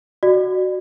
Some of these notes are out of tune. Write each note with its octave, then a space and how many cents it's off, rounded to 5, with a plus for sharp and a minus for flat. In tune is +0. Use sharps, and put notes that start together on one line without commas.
F#4 +0 D5 +40